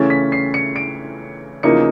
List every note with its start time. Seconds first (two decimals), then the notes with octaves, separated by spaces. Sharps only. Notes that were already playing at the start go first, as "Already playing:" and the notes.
Already playing: C#3 E3 A3 C#4 A6
0.10 B6
0.32 C7
0.54 C#7
0.76 D7
1.63 E2 C#3 F3 A#3 D#4 C#7